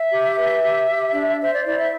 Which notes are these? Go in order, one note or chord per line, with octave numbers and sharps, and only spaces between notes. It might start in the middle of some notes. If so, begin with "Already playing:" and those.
Already playing: E5
G4
B4
G4
G4
D4
C5 E5
D5
E4 D5
E5